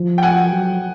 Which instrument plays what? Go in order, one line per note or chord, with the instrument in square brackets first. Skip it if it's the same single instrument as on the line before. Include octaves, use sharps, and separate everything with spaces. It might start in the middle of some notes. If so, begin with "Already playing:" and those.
Already playing: [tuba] F3
[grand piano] G5
F#5 G#5
[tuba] F#3